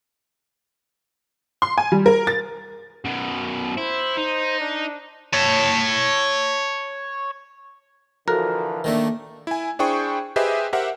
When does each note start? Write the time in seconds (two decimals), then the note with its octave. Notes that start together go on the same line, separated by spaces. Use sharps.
1.62 C6
1.78 G#5
1.92 G3
2.06 A#4
2.27 A6
3.05 F#2 B2
3.78 E4 C5
4.17 D#4
4.60 D4
5.33 C#5 A5
8.28 D3 E3 F3 F#4 A4 A#4
8.84 D#3 A3 A#3 D4
9.47 E4 G#5
9.79 D4 E4 G#4 C5 G5 C#6
10.36 G4 G#4 B4 C5 D#5 E5
10.73 G4 A#4 C5 E5 F#5